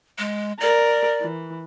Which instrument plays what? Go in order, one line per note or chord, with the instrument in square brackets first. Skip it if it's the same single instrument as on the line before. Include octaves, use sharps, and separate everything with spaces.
[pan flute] G#3
[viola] A#4 [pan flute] D5
[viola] E3